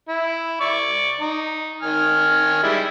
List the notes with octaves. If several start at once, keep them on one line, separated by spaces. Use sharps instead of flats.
E4
D5 C#6
D#4
D#3 G#5 F6
G3 G#3 E4